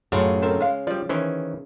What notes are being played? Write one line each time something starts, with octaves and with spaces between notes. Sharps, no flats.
F#2 A2 C#3 F4
C4 A4 A#4
G#3 F5
F3 G3 D5
D#3 E3 C#4 C5